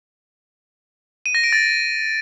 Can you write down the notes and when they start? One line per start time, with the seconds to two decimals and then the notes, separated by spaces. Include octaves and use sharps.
1.26 D#7
1.35 A#6
1.44 D7
1.53 A6